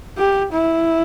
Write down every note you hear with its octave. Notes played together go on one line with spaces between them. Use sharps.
G4
E4